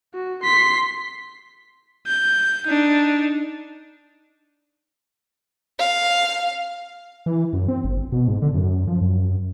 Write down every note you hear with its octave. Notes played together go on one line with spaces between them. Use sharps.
F#4
C6 B6
G6
D4 D#4
F5
E3
F#2
C4
G1
B2
G#2
D3
F#2
F3
F#2